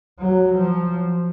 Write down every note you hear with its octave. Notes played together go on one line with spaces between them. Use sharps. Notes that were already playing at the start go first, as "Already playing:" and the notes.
F#3
F3